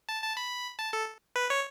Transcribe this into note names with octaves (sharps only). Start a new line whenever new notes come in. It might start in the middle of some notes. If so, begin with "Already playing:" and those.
A5
A5
B5
A5
A4
B4
C#5